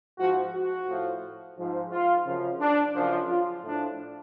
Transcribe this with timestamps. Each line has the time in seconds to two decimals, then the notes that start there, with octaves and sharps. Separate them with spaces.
0.19 G#2 F3 F#4
0.53 F#4
0.88 A2 F3
1.57 G#2 F3
1.91 F4
2.26 F#2 C#3 F3
2.60 D4
2.94 F#2 C#3 F3
3.29 F4
3.63 A2 F3 D4